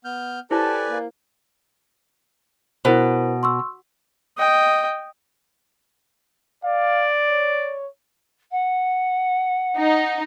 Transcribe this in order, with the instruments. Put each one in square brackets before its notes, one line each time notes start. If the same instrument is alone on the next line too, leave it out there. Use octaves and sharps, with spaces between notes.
[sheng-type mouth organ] B3 F6 G6
[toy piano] E4 C5 [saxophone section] G4 A4 [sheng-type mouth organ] B4 D5 G#5 [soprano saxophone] A5
[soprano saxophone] A#3
[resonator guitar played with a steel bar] B2 [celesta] E4 A#4 C5
[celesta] C6 C#6 E6
[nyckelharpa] D#5 G5
[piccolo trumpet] D5 [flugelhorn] F5
[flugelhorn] C#5
[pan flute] F#5
[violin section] D#4